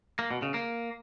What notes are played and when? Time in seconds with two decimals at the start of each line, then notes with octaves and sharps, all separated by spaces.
0.19 A#3
0.31 B2
0.42 C#3
0.54 A#3